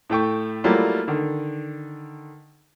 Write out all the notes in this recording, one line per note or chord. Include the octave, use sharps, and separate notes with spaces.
A2 A3 G5 C#6
F#3 G3 A3 A#3 E4 F4
D3 D#3